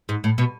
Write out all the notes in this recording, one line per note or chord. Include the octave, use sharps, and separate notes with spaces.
G#2
A2
B2